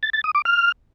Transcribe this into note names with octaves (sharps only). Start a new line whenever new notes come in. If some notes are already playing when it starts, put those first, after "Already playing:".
A6
A6
D#6
D6
F6